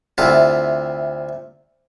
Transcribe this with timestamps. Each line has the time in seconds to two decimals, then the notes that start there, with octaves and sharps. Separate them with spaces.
0.18 D2 C3 E4 F4 A5